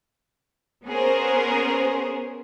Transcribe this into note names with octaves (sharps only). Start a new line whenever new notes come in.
B3 C#4 G#4 A#4 C5